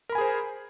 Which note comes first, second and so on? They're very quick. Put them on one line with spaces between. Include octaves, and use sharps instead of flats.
A#4 B5 G#5 G#4 C5